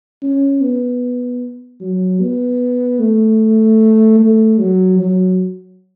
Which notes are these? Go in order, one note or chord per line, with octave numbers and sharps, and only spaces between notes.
C#4
B3
F#3
B3
A3
A3
F#3
F#3